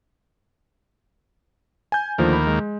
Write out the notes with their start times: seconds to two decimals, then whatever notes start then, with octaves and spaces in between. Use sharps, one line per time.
1.92 G#5 G6
2.18 D#2 D3 F3 A3 A#3
2.33 B5
2.47 G#3